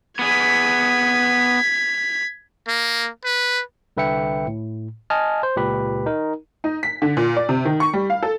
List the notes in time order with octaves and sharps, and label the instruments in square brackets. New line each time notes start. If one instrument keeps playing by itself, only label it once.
[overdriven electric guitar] B3 G#4 [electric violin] G#6 B6
[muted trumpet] A#3
B4
[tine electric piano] C2 D3 B4 E5 G5 C#7
A2
D#5 G#5 A5 F6
C5
C#2 A#2 G4 B4 B5
D#4 A#4
[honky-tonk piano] D#4
B6
D3
A#2
D5
C3
D#3
C#6
G3
F5
A4